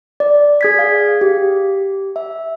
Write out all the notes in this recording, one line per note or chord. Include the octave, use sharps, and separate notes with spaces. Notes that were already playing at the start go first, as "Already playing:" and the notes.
D5
G#4 G#6 B6
F5
G4
E5